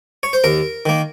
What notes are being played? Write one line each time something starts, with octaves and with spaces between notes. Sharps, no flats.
C#5
C5
D#2 A#4
D#3 A#3